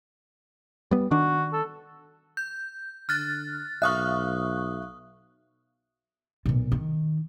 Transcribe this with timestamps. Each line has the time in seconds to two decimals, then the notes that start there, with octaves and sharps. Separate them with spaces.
0.91 G3 B3
1.11 D#3 D4 F#4
1.53 A4
2.37 G6
3.09 D3 F6 F#6 A6
3.82 B1 E5 F5 C#6 D#6 F6 F#6
6.46 B1 A#2
6.72 D#3